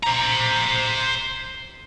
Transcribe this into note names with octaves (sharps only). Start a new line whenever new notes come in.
C5 A#5